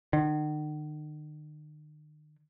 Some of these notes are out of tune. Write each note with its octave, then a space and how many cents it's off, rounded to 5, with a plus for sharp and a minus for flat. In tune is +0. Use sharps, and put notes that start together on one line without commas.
D#3 -45